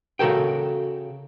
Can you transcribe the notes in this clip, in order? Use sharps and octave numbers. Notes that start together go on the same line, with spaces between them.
C#3 F#4 A4 A#4 G5